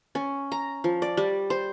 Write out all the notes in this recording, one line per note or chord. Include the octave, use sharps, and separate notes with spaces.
C#4
A#5
F3
D5
G3
C5